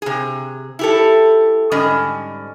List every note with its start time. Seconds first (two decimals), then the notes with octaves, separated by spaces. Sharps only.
0.02 C3 G#4
0.79 E4 G4 A4
1.71 G#2 D3 G3 C#4 D#5